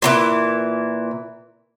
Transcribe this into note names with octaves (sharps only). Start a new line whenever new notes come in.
A#2 D3 E3